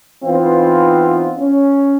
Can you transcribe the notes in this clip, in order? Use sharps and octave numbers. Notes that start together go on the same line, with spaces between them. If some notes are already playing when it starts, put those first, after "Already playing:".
E3 B3 C4 D#4 F4
C#4